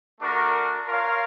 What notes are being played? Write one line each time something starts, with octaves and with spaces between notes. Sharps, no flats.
A3 D4 F#4 A#4
F4 A#4 C#5 F5